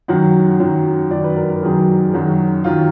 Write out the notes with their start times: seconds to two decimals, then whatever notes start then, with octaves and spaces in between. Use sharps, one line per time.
0.08 F#2 D#3 F#3 F#5
0.60 F#2 D#3 F#3
1.11 F#2 D#3 F#3 D5
1.24 B4
1.36 A#4
1.49 A#4
1.62 F#2 D#3 F#3 G#4
2.09 G#4
2.13 F#2 D#3 F#3 F#4
2.64 D#3 F#3 F4